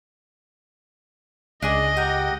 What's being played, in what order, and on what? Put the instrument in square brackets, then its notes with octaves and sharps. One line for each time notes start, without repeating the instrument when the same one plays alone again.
[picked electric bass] C#2 [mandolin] D4 G#4 D5 [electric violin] D#5
[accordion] G4 F#5 [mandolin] A#4 G5